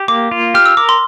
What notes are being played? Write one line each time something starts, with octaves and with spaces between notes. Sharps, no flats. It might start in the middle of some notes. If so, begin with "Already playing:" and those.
Already playing: G4
A#3 D6
F4
G4 F6
E6
A#4 D6
C6